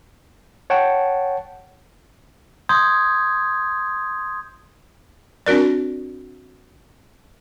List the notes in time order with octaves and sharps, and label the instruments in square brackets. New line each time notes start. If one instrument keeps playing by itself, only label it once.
[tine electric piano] C#5 F#5 G5 A5
[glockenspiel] C6 D#6 G6 G#6
[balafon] C4 D4 F#4 A#4 D5